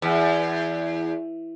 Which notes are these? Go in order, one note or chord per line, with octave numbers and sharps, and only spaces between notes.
E2